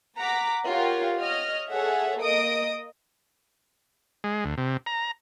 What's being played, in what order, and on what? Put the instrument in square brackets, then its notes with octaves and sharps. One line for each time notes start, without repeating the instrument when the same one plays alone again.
[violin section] F#5 A#5 D6 B6
F4 G4 A#4 C#5 F#5
C#5 D#5 F6
G#4 A4 C#5 E5 F#5
A#3 D#5 D#6 D7
[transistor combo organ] G#3
D2
C3
A#5